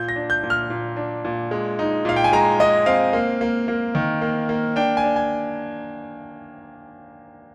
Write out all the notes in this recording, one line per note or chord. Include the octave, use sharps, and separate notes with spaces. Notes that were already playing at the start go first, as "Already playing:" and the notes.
Already playing: A#2 G6
A#6
D4
G6
A#2
F6
A#2
D4
A#2
G#3
D#4
A#2 F5
G5
G#5
G#3 A#5
G#3 D#5
C4 F5
A#3
A#3
A#3
D#3
A#3
A#3
D4 G5
G#5
D4
G#5